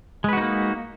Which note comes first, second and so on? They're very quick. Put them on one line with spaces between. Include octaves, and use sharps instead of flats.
G#3 B4 F#4 D#4 A#3